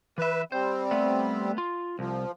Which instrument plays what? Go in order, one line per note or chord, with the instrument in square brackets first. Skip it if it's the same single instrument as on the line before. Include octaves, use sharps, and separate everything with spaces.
[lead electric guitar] E3 E5 [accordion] B4
[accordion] G3 C4 [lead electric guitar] C5
[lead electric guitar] A3 B3
F4
[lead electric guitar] C2 [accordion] F3